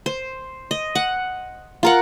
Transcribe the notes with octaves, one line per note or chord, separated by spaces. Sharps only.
C5
D#5
F#5
F4 A#4 F#5